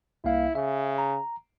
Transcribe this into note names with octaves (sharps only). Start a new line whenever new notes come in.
C2 A#3 E4 F5
C#3 E5
A#5